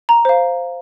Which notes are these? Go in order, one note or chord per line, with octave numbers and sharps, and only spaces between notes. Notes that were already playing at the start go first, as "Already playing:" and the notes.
A#5
C5 F5